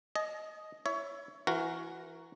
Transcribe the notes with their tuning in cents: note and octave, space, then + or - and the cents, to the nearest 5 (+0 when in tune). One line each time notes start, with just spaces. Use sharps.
D#5 +0 G#5 +45
E4 +0 C#5 +20 E5 +15
E3 +25 F#4 +0 A#4 +0